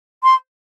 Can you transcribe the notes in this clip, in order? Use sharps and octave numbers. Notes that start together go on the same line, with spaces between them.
C6